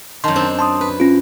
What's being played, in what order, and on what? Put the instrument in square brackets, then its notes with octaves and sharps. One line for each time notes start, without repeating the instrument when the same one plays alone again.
[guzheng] F#2 D#3 [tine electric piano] A5 C6
[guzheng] C4 D4
[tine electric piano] A5 C6 D#6
[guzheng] B4
[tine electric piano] C#4 F4